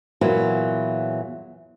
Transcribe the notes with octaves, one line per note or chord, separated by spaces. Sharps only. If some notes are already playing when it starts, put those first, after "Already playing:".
E2 A#2 E3 F#3